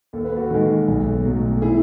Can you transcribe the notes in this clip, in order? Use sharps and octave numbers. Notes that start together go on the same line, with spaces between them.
D#2 A4
B4
F#4 A4
D#3 G#3 F#4 A4
B1
B2 F#3 A3
E4 G#4